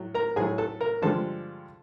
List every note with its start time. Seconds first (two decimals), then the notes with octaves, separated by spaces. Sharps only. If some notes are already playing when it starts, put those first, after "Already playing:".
Already playing: A2 F#3
0.14 A#4 A#5
0.36 A2 F#3 A3 G#4 G#5
0.58 A4 A5
0.81 A#4 A#5
1.02 G2 D3 F3 G#3 A4 A5